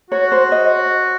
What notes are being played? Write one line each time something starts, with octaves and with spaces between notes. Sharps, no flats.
F#4 C#5
C5
D#5